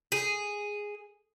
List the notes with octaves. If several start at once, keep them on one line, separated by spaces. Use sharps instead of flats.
G#4